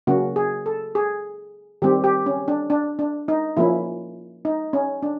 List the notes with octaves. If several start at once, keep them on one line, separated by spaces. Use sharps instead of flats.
C#3 F#3 A#3 C#4 F#4
G#4
A4
G#4
D#3 G3 C4 G4
G4
C#4
D4
D4
D4
D#4
F3 A#3 C#4 E4
D#4
C#4
D4